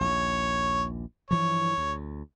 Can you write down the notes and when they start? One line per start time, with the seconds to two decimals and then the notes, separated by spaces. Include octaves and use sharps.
0.01 A#1 D#2 C#5
1.31 G2 E3 F3 C#5
1.78 D2